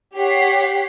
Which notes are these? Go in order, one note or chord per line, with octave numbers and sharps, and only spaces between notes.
G4 C#5 F#5 B6 C7